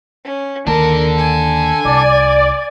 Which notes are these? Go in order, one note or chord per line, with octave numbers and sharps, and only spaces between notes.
C#4
D#2 D4 A4 A#4
G#5
C2 D5